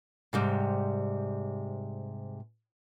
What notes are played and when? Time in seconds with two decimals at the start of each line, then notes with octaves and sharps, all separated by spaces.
0.33 G#2 C3 G3